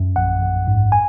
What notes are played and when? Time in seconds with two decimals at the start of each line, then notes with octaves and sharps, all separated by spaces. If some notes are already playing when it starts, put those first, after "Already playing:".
Already playing: F#2
0.16 A#1 F#5
0.41 A#1
0.67 G#2
0.92 G#5